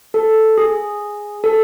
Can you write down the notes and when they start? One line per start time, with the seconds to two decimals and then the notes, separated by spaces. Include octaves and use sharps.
0.14 A4
0.58 G#4
1.44 A4